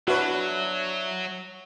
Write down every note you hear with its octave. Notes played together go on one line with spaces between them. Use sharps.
F#3 D4 E4 F#4 B4 C#5